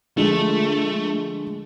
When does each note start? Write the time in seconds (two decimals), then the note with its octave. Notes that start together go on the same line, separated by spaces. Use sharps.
0.17 D3 F3 G#3 A3